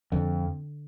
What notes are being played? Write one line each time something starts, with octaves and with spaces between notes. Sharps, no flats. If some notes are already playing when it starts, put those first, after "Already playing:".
F2 D3